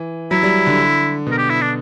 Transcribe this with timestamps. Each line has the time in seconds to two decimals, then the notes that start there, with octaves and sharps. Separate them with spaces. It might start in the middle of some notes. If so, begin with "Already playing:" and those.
Already playing: E3
0.31 F#3 E4
0.43 G3
0.67 D3
1.27 B2
1.32 A#4
1.38 G4
1.50 E4
1.61 D4